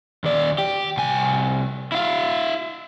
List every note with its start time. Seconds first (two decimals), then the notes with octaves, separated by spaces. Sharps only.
0.24 D#2 D5
0.58 G4
0.97 C2 G#5
1.92 E4 F5